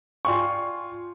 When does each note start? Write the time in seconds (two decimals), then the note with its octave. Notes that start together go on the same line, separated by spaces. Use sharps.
0.25 F4 D5 G5 G#5 C6 C#6